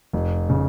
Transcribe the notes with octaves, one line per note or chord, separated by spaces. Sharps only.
F1
C#3